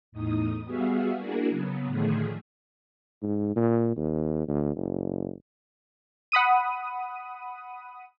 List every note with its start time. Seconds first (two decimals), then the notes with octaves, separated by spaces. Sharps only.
0.12 E2 A2 D#4 D#6
0.64 G3 B3 F#4 G#4 E5 F5
1.18 A#3 D4 E4 F#4 G#4 A#4
1.49 C#3 F#3 B3
1.86 A2 D3 D#3 F3 A3 G#4
3.23 G#2
3.56 A#2
3.97 D#2
4.48 D2
4.76 F#1
6.32 F#5 B5 D#6 D#7